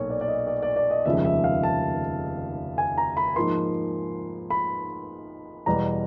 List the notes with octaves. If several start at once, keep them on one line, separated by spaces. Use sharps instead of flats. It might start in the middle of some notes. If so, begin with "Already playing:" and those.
Already playing: B1 A#2 C#5
D5
D5
D#5
D5
D5
D5
D#5
F1 D#2 C#3 F3 G#3 E5
E5
F5
A5
G#5
A#5
B5
G#2 F3 A#3 C6
B5
E2 B2 G3 A#5